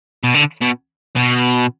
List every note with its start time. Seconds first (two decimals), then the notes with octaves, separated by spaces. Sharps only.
0.24 B2
0.35 D3
0.62 B2
1.16 B2